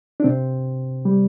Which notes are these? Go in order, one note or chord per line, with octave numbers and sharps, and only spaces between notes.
D4
C3 C4
G3